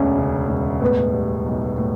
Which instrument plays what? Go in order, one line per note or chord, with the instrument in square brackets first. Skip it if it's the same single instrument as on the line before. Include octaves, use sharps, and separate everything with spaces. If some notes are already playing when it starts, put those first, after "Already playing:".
Already playing: [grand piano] E1 D2 [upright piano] C#4
[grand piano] C#3
E1
[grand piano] A2 [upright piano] B3
[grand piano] G3
B1
A2